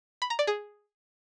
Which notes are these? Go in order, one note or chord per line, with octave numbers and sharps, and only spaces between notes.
B5
A#5
D5
G#4